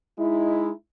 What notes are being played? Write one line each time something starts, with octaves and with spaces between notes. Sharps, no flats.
G#3 D#4 E4